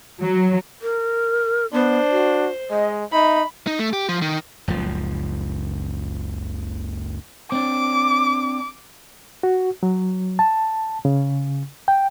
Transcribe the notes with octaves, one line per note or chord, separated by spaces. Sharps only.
F#3
A#4
B3 D4 C5
F#4
G#3 D#5
D#4 E5 B5
D#4
A3
G4
F3
D#3
F#1 C#2 F3
C4 D4 D6
F#4
F#3
A5
C#3
G5